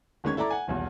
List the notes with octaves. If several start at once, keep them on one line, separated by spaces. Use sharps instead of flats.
G1 D#3 G#3 C#4 C#6 G#6
E4 A4 D5 A#5 D6
F#5 G#5
D#1 B1 E2